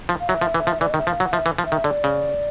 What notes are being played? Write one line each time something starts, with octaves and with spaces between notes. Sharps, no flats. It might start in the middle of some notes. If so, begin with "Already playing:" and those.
F3
F5
F#3 E5
F3
E3
F3
E3 D5
D#5
D#3
E5
F3 F5
F#3 F#5
F3 E5
E3
F3
E5
D#3
D3 D5
C#3